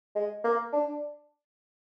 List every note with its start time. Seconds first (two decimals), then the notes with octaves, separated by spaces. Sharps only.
0.15 G#3
0.44 A#3
0.72 D4